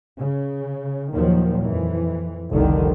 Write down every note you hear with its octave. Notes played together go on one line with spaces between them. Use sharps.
C#3
D#2 A#2 D#3 F3 F#3
F2 E3
F1 C2 D3 D#3